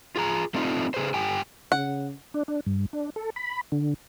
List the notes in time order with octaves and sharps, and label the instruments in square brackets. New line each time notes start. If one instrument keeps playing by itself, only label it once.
[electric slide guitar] F4 G#4 A#5
A3 C4 D4 D#4 F4
C#3 G#4 B4 C5
G2 G4 G5 G#5
[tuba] C#3 [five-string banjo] F#5
[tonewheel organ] D4
D4
G2
D4
A4
B5
D3